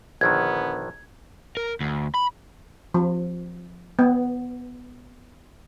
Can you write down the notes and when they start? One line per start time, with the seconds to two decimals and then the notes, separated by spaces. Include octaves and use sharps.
0.21 A#1 D3 D#3 B3 G#6
1.57 A#4
1.80 D2
2.15 B5
2.94 F3
3.99 B3